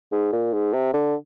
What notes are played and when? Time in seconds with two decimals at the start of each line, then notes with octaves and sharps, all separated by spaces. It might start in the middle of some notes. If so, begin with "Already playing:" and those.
0.12 G#2
0.32 A#2
0.53 G#2
0.73 C3
0.93 D3